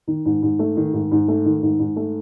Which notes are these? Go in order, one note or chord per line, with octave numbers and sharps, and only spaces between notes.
D#3
G#2
G#2
A3
D#3
G#2
G#2
A3
D#3
G#2
G#2
A3